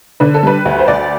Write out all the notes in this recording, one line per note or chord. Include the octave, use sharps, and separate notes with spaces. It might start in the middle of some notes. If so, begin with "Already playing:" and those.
D3 B4
A4
G3 B4
D2
C5
D2 D5